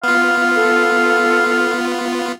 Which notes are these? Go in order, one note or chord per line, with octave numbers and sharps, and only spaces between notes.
B3 F4 F5
A4